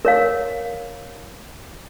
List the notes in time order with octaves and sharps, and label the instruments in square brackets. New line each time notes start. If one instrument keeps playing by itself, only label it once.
[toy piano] A#4 C#5 F5